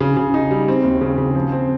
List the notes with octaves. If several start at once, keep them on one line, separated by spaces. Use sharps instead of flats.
C#3
C#3
D#4
G3
C4
D#2
C#3
C#3
F3
C4